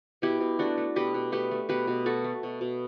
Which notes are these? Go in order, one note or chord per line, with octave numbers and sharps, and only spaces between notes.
B2 E4 G4
B2
A3 D4 F#4
A3
B2 G4 B4
B2
A3 G4 B4
A3
B2 G4 B4
B2
A3 F#4 A4
A3
B2
B2